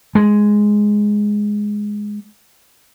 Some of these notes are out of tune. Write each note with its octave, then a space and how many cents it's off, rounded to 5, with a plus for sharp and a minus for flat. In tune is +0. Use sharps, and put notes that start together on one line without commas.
G#3 +0